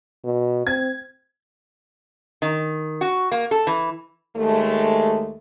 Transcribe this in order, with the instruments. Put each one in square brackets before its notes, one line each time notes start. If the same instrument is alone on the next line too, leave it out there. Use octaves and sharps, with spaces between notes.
[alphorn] B2
[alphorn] C4 [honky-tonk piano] G#6
[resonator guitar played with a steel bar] D#3
F#4
A#3
A4
E3
[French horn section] D#2 G#3 A3